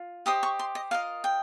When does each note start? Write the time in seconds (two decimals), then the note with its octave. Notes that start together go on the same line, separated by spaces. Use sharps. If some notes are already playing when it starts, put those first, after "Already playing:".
Already playing: F4
0.26 G4 C5 D#5 D#6
0.43 C#6
0.59 C6
0.75 D#5
0.91 F4 A#4 D#5 F5
1.24 G5